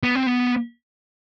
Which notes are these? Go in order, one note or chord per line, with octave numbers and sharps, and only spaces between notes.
B3
C4
B3